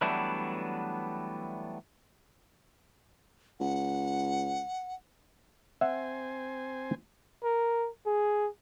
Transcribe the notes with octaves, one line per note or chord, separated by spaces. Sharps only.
E3 F#3 G3 A3 B3 D4
C#2 F#5
C4 C5 E5 F#5 G#5
A#4
G#4